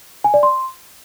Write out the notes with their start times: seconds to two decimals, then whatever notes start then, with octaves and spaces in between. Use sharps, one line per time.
0.24 G#5
0.34 D5
0.43 C6